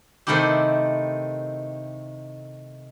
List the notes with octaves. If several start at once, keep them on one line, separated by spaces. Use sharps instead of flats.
C3 D#3 A3 D#4 E4 G4